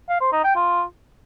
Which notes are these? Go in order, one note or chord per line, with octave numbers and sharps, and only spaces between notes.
F5
C5
D#4
G5
F4